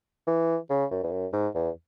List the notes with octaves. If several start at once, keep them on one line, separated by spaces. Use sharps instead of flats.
E3
C#3
F#2
E2
F#2
G#2
E2